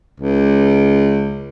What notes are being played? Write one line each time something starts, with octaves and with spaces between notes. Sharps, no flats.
C#2